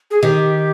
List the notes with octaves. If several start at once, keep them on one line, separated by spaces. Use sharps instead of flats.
G#4
D#3 G4